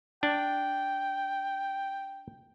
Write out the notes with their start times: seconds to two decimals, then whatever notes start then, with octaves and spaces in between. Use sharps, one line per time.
0.23 D4 G5